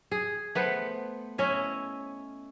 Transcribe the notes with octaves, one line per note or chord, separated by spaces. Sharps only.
G#4
A3 B3 B4 C5
C#4 E4 D#5